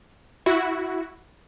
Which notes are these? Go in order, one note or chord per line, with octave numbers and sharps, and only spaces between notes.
E4 F#4